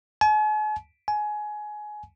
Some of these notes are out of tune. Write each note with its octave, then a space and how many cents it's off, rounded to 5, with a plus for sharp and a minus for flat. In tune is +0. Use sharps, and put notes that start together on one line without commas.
G#5 +45
G#5 +20